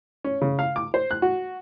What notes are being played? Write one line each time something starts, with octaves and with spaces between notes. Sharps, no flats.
C#4
C#3
F5
D6
C5
F#6
F#4